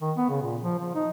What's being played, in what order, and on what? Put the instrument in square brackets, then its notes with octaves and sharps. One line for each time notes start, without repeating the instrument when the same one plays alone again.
[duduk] D#3
B3
C#3
A#2
F3
F3
D#4